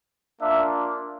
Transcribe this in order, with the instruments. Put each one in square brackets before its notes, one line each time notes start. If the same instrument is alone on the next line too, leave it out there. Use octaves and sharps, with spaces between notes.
[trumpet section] A#3 D4 F4 E5